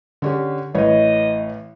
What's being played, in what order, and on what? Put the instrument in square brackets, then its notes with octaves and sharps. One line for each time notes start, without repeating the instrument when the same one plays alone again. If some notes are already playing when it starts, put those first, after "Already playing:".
[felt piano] D3 C#4 G4
[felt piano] A1 B4 C#5 [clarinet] D#5